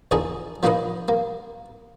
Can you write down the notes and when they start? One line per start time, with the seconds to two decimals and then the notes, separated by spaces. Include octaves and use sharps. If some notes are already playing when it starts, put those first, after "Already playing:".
0.11 E2 A#2 D3 D#4 G#4 A5
0.63 F3 A#3 D4 D#4 B4 D#5
1.08 A#3